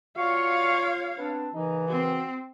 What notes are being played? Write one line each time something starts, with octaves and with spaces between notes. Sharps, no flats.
F4 F#4 C#5 D5 F5 C#6
B3 C4 D4
D#2 C#3 E3 D#4
C4 F#4